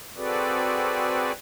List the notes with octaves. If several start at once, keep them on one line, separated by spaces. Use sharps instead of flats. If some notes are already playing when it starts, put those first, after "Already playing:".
C4 F#4 G#4 A4 B4 D5